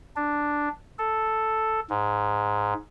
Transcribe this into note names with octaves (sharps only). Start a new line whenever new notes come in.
D4
A4
G#2